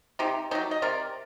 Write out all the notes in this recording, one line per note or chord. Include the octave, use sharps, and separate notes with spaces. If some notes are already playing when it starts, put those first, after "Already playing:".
C3 D#4 G4
D#3 F#3 D#4 G4
D#5
C3 A#4 D5